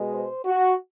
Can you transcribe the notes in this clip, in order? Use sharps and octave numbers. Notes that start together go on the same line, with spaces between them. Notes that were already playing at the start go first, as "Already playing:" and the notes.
Already playing: B2 G#3
C5
F#4